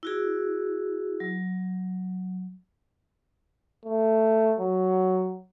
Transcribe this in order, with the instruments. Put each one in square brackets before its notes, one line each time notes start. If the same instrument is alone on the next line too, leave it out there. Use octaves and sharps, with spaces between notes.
[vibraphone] E4 F#4 G#4
F#3
[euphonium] A3
F#3